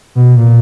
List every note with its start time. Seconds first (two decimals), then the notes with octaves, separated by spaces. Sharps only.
0.15 B2
0.36 A#2